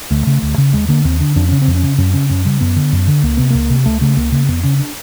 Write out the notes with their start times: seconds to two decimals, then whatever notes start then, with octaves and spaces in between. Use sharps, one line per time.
0.11 D2 A3
0.27 C#3
0.42 D2
0.58 C#3
0.73 D#2 G#3
0.89 D3 A#3
1.05 D#2 C4
1.20 D3 D4
1.36 F2 D4
1.49 C#3 C#4
1.62 C4
1.67 F2
1.75 C#4
1.83 C#3
1.98 F#2 C#4
2.14 C#3 C#4
2.29 F#2 C#4
2.45 C#3 G3
2.61 F#2 B3
2.76 D3
2.92 F#2
3.07 D3
3.23 C#2 A#3
3.37 C3 B3
3.50 C#2 A#3
3.70 C3
3.86 C#2 A3
4.01 C#3 A3
4.17 C#2 A#3
4.32 C#3 A#3
4.48 F2 B3
4.63 C#3 C#4
4.80 D4